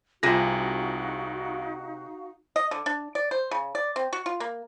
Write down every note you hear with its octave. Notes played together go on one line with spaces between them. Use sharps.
C2 C3 D#4 F4 F#4 G#4 F5 A#6
D#5
D3
D4
D5
C5
C#3
D5
C4
F#4
F4
A#3